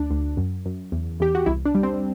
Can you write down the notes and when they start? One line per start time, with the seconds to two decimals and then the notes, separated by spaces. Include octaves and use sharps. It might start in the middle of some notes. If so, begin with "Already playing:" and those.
Already playing: D2 D4
0.11 D2
0.37 F#2
0.66 F#2
0.92 E2
1.20 E2 G4
1.35 F#4
1.46 C2 E4
1.65 D4
1.75 G3
1.83 C4